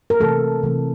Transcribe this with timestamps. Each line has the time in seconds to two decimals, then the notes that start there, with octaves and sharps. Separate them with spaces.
0.10 A#4
0.20 C3 E3 A3 A4
0.63 C3 E3 A3